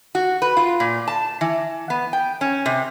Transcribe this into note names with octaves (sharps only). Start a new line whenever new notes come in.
F#4
B4
F4
A#2
A5
E3
B3
G5
C#4
C3